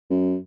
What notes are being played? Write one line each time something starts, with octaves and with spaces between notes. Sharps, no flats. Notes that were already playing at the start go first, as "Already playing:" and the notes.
F#2